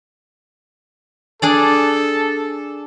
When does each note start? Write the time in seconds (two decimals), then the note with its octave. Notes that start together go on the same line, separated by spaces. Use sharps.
1.42 D4 G#4 A4 D5